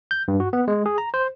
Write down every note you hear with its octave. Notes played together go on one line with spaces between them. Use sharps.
G6
G2
F#4
B3
G#3
G#4
A#5
C5